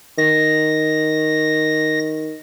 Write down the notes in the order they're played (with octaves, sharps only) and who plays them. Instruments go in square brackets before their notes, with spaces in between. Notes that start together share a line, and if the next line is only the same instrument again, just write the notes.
[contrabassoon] D#3 [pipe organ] A#6